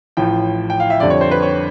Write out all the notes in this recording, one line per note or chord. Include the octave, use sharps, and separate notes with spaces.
A1 A2 F3 G5
G5
F5
E5
F2 D3 G3 D5
C#5
C5
B4
C#5